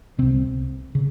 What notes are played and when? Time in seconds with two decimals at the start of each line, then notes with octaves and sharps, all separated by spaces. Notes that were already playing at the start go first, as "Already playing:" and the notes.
0.18 C2 C3 C4
0.95 C#3